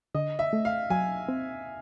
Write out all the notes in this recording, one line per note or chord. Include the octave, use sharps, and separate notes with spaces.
D3 D#5
E5
A3
F5
F#3 G#5
C4